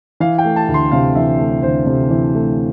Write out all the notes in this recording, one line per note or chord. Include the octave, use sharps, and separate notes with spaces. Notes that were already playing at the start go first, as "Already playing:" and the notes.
E3 F5
G5
A3
A5
D2
C6
C3 F5
E3 E5
A3
D2 C5
C3
E3
A3